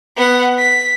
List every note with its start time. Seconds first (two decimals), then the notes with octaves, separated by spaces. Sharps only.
0.16 B3 F#5
0.58 B6